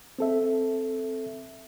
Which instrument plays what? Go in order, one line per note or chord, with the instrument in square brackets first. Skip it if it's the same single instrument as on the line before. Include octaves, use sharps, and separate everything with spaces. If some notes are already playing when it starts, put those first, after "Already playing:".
[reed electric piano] C4 A4 E5